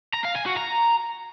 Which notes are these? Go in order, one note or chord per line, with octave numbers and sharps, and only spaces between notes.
A#5
F5
G#5
F#4
A#5